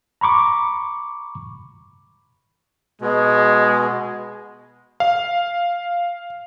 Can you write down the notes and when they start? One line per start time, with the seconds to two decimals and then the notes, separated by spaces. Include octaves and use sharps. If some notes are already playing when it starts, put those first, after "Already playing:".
0.21 A#5 B5 C#6 D6
3.01 B2 G#3
5.00 F5